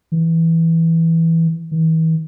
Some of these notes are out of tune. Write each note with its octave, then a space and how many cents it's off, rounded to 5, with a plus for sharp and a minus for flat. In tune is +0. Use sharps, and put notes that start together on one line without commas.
E3 -5
E3 -40